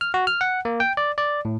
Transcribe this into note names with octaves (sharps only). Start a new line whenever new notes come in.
F6
F#4
F6
F#5
A#3
G5
D5
D5
A2